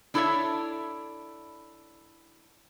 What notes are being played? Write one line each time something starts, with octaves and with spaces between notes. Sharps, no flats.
D4 E4 A4 C5 C#5 E5